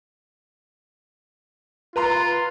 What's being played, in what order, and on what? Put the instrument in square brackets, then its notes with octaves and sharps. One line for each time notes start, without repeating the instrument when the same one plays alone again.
[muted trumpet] F4 [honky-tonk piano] B4 A#5 C6